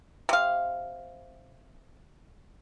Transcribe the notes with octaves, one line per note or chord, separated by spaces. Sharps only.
C3 F5